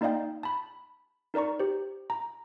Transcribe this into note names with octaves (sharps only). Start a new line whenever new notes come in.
A#3 D#4 D5 D#5 F5 G5
A5 B5
D#4 A#4 D5 A#5 C#6
G4 C5
A#5